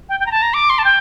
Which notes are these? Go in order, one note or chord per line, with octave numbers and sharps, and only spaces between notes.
G5
G5
A#5
A5
A#5
D6
C6
A5
G5